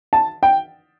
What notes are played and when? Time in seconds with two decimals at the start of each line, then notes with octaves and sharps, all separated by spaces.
0.13 A5
0.43 G5